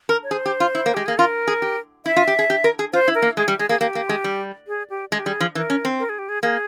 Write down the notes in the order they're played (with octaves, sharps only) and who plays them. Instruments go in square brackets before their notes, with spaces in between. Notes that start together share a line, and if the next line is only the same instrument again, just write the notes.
[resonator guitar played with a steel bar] A#4
[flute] C#5
[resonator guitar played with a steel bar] G#4 [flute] C5
[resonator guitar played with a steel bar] G4
F4
E4
A#3
[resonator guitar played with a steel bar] G#3 [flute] G4
[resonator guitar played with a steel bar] A#3 [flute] G#4
[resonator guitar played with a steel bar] F4 [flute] A#4
[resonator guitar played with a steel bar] G#4
G4
[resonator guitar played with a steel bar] E4 [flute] E5
[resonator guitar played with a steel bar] F4
G4
G#4
G4
A#4
G#4
[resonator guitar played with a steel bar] F4 [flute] C5
[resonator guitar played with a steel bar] E4
[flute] A#4
[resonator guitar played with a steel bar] A#3
[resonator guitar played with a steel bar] G#3 [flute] G#4
[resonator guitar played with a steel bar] G3 [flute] G4
[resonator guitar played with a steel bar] G#3 [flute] G#4
[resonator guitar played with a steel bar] A#3 [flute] G#4
[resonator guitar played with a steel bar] A#3 [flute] G4
[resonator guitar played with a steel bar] A#3
G#3
G3
[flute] G#4
G4
[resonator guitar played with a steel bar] G#3 [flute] G#4
[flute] G4
[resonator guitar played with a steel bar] G3 [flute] G#4
[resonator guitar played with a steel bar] F3
[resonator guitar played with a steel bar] E3 [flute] A#4
[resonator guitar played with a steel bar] C#4
C4
[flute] A#4
G#4
G4
G#4
[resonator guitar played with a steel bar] A#3 [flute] G#4